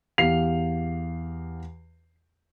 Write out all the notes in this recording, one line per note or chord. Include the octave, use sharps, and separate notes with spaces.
E2 G4 F5 C7 F7